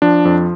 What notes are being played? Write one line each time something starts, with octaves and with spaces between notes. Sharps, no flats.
F3 D4
F2